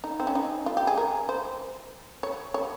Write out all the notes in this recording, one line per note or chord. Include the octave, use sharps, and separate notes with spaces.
D#4
C4
C#4
D#4
F4
G4
G#4
A#4
C5
C#5
C#5